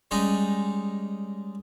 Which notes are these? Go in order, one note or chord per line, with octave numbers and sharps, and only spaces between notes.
G3 G#3 C#4 D#4